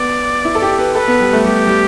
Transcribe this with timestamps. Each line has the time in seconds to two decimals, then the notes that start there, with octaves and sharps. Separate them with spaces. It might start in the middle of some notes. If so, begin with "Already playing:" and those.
Already playing: B3 D5
0.45 E4
0.55 A4
0.62 G4
0.79 B4
0.95 A4 B4
1.08 B3
1.20 G3
1.33 A3
1.45 G3 G4
1.67 G3